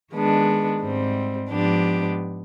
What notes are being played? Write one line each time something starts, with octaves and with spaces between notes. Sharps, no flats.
D#3 G#3 B3 D4
G#2 G3 C4
G#2 F3 B3 D4 G4